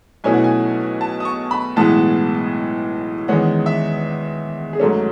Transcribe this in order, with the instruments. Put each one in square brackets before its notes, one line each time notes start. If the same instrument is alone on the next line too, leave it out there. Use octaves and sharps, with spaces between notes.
[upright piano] B1 B2 A3 C#4 E4 G#5
F#5
G#5
A5
D#6
C#6
B5
B1 A2 E3 G#3 B3 A5
E2 D#3 G#3 C#4 F#5
E5
G#4
G#2 F#3 A3 C#4 A4